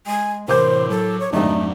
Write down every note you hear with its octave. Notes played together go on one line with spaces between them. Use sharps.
G#3 G#5
A2 C3 E3 A#4 C5 D6 G6
F#3 A4
C#5
G#1 F2 D#3 F#3 A3 D4 D#4